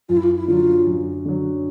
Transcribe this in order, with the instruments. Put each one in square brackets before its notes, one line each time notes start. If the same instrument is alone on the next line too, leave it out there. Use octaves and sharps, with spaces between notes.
[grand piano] F#2 [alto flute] F4
[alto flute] E4
F4
E4
[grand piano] D3 F#3 [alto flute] F4
[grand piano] F#2
D3 F#3